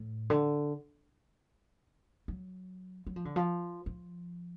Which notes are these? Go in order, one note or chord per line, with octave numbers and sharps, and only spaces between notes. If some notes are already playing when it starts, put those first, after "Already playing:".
Already playing: A2
D3
F#3
F#3
F3
D3
F3
F3